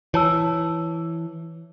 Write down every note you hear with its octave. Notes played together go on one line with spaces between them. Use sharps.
E3 C#5 A5 E6